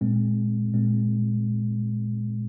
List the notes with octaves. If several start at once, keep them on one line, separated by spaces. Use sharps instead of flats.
A#2 G#3 C4
A#2 G#3 C4